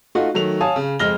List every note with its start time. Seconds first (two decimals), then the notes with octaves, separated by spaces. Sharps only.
0.15 A3 D#4 F4 F#4
0.34 D#3 F#3 A3 F7
0.61 C#5 F5 G#5 A5 D#6
0.76 C#3
0.99 F2 G#3 F6 A#6 G7